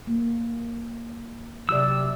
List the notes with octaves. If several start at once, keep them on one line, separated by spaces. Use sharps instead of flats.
A#3
C3 F#3 G4 D5 E6